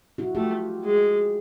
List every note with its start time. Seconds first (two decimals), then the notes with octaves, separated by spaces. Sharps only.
0.18 E4 F#4
0.35 A3 F4 G4
0.85 G#3